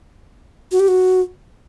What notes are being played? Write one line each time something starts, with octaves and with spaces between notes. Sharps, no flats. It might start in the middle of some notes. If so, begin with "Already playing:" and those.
F#4
G4
F#4